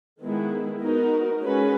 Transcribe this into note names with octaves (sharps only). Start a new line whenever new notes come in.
D#3 G#3 B3 E4
B3 D#4 F#4 A#4
G#3 C#4 F#4 B4